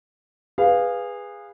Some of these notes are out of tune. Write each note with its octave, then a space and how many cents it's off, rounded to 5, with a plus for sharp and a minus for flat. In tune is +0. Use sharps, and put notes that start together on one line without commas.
G#4 -20 B4 +0 F5 +0